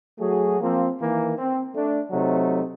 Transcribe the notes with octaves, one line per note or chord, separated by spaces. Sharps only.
F#3 A3 F#4 G#4
F3 A#3 C4
D#3 E3 A#3
C4
A3 D4
C3 F#3 A3 C4 D#4